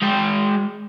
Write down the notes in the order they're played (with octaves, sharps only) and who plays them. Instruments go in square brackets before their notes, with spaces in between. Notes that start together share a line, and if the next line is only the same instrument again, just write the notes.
[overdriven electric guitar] G#3 G5